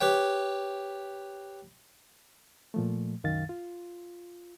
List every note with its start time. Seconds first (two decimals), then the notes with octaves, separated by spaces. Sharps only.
0.01 G4 B4 C#5 G5
2.74 A#2 F3 A3
3.24 C2 F#2 D#3 F5 A6
3.49 F4